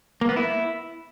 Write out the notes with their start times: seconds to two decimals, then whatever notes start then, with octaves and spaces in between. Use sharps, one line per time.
0.21 A#3
0.29 B3
0.36 E4